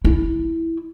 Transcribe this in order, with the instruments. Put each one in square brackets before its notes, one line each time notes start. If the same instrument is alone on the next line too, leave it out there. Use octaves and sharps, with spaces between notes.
[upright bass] E4